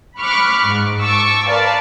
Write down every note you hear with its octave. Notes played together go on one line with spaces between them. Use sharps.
B5 C#6 D6 F6 F#6
G#2
A5 C#6 D6 E6
A#4 B4 D5 F5 A5